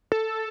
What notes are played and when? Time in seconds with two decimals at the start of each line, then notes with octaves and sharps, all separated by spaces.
0.12 A4